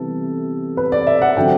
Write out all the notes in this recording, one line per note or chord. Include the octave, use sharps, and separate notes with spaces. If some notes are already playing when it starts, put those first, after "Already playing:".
Already playing: C3 E3 G3 B3 A4
B4
D5
E5
F#5
D3 F#3 C4 G5